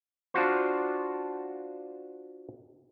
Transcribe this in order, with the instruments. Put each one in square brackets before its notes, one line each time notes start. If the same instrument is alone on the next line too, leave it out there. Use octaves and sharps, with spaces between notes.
[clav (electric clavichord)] D4 F4 F#4 C5